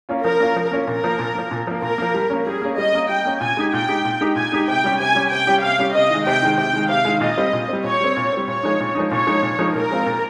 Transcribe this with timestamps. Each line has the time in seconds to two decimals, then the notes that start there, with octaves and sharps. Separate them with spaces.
0.09 A#3 C#4 F4
0.24 F3 A#4
0.40 A#3 C#4 F4
0.56 F3
0.72 A#3 C#4 F4
0.87 A#2 A#4
1.04 F3 A#3
1.19 A#2
1.34 F3 A#3
1.51 A#2
1.67 F3 A#3
1.82 A#2 A#4
1.98 F3 A#3
2.14 G3
2.30 A#3 C#4
2.46 G3 G#4
2.62 A#3 C#4
2.78 G3 D#5
2.93 A#3 C#4
3.09 G3 G5
3.25 A#3 C#4
3.41 A#2 G#5
3.57 G#3 D#4 G4
3.73 A#2 G5
3.89 G#3 D#4 G4
4.05 A#2
4.21 G#3 D#4 G4
4.36 A#2 G#5
4.52 G#3 D#4 G4
4.68 C3 G5
4.84 G3 C#4 G4
4.99 C3 G#5
5.15 G3 C#4 G4
5.31 C3 G5
5.47 G3 C#4 G4
5.63 C3 F5
5.79 G3 C#4 G4
5.95 C3 D#5
6.10 D#3 G#3
6.26 C3 G5
6.42 D#3 G#3
6.58 C3 G5
6.73 D#3 G#3
6.89 C3 F5
7.05 D#3 G#3
7.21 A#2 D#5
7.37 G3 C4
7.53 A#2
7.69 G3 C4
7.84 A#2 C#5
8.00 G3 C4
8.17 A#2
8.33 G3 C4
8.48 A#2 C#5
8.63 F3 G#3 D#4
8.80 A#2
8.95 F3 G#3 D#4
9.11 A#2 C#5
9.27 F3 G#3 D#4
9.42 A#2
9.59 F3 G#3 D#4
9.74 A#2 A#4
9.91 G#3 C4 F4
10.06 A#2